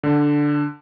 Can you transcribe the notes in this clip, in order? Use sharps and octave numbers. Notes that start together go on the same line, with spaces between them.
D3